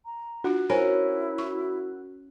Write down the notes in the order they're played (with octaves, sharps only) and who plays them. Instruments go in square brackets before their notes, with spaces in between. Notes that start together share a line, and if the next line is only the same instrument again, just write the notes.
[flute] A#5
[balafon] D4 F4 [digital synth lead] F#4
[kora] C#4 A#4 [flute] E4 [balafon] C5 G#5 B5
[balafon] C#6